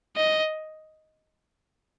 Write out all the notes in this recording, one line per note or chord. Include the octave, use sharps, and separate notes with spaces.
D#5